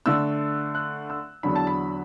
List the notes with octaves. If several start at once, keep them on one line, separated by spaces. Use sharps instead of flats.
D3 A3 D4 E6
F#6
E6
E2 D3 F#3 D4 B5
A5
B5